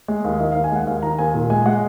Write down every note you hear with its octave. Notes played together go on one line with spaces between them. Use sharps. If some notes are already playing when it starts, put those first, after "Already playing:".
G#3
D#2
D#3 D#5
F5
D#2
G#5
G#3 F#5
D#2 F5
D#3 A#5
D#2 G#5
A#2
G#3 G#5
G#3 F#5